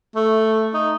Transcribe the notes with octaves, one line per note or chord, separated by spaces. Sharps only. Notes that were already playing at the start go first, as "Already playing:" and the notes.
A3
D#4